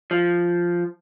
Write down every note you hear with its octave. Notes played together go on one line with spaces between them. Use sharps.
F3